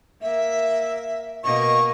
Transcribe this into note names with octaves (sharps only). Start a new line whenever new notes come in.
A#3 E5
B2 A#3 D#5 C#6